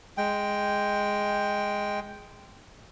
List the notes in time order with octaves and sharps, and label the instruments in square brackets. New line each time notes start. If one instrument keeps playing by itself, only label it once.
[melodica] G#3 G5